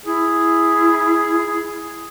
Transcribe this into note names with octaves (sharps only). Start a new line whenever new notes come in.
E4 G#4